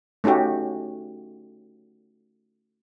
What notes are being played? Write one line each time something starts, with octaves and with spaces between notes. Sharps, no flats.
A3 C#4 D#4 F#4 G4